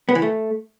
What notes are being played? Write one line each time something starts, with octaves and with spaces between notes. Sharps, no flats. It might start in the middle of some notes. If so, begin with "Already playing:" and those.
B3
E3
A3